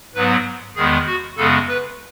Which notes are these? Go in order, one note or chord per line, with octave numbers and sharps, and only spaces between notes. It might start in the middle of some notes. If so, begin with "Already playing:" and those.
G#2 F#3 B3 B4
E2 D#3 G#3 B3 G#4
F#4
F#2 C#3 G#3 B3 A4
B4